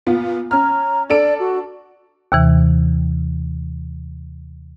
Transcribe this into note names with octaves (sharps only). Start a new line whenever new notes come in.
A#2 B3 F4
C#4 A#5 F6
D4 A4 D5 D7
F#4
D#2 C3 E3